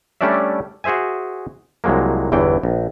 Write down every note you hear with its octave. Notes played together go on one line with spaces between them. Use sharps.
G3 A3 C#4 D4 D5 E5
F#4 G#4 C5 E5 G#5
C2 F3 F#3 G#3 A#3
G1 E2 E3 G5
A#1